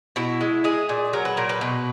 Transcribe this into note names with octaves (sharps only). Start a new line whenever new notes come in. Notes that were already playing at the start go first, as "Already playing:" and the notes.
B2 E4
G#3
G#3 G#4
A#2
F#3 A#4
B4
A#2 A#4
B4
B2